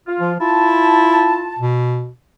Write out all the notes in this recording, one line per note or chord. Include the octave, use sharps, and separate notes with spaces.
F4
F3
E4 F4 A5
B2